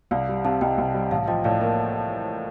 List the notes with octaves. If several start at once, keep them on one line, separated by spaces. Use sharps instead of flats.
C2 D5 F5
G3
C3 F5 A5
C2 D#5 G5
C2
G3
A1 F5 A5
F3 D#5 G5
A2 D5 F5
A#3 A#4